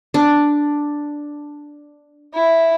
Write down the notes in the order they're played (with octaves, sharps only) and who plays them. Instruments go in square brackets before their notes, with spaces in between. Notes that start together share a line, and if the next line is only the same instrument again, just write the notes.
[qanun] D4
[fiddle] E4